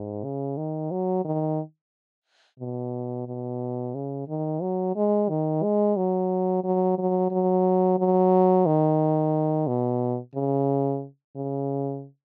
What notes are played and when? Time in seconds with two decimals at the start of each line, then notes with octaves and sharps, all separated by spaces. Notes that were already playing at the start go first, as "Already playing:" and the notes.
Already playing: G#2
0.24 C#3
0.57 D#3
0.91 F#3
1.25 D#3
2.60 B2
3.27 B2
3.95 C#3
4.28 D#3
4.62 F#3
4.96 G#3
5.29 D#3
5.63 G#3
5.97 F#3
6.64 F#3
6.98 F#3
7.31 F#3
7.99 F#3
8.66 D#3
9.68 B2
10.35 C#3
11.36 C#3